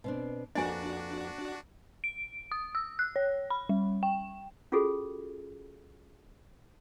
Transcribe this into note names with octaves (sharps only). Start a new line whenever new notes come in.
B2 C4 D4
F2 A#3 D4 F#4 B4 D#5 G#5
D7
D#6
E6
F#6
C#5
B5
G3
G5
C#4 F4 F#4 G#4 A4